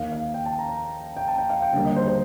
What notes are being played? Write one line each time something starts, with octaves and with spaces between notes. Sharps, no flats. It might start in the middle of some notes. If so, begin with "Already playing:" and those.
Already playing: D#2 D#3 A#3 F5
F5
G5
A5
A#5
A#5
G5
A5
G5
F5
G5
D#2 D3 G3 A#3
D#5
C5
C5